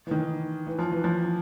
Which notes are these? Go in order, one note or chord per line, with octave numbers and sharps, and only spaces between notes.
E3
D#3
E3
F3
E3
F3